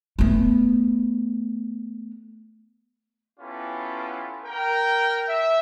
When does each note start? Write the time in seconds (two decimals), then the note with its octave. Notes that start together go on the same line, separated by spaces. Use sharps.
0.19 A3 B3
3.40 B3 C#4 E4 F4 G4 A4
4.44 A#4 G5
5.27 E5